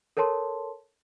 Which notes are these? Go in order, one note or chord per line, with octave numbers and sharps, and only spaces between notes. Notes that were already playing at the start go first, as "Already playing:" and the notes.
A4 A#4 C#5 A5 C6